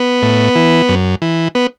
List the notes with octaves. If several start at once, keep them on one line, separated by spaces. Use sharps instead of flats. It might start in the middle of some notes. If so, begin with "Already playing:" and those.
Already playing: B3
A2
E3
F#2
E3
B3